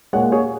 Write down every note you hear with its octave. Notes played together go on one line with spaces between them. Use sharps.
A#2 G#3 C#5 F#5
G#4 C#5